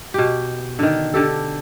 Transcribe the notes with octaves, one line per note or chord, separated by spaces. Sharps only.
B2 G4
D3 D#3
D3 G4 A4